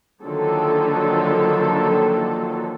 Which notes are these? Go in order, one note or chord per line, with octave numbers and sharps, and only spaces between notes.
D3 D#3 F3 F#3 A#3 A4